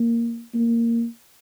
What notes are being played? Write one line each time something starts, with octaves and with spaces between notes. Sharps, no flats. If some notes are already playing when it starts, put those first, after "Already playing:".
Already playing: A#3
A#3